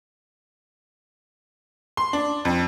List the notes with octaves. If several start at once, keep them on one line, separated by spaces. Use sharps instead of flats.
C6
D4
F2